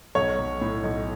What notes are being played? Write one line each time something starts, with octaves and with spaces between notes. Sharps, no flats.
B1 C#5
B1
A2
B1